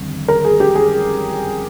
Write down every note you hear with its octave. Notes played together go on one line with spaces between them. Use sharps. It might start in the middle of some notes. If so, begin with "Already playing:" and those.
Already playing: G1 F2 D#3
A#4
G#4
G4
G#4